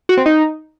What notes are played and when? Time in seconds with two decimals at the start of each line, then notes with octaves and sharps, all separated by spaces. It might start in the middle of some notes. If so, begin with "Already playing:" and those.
0.09 F#4
0.17 C4
0.26 D#4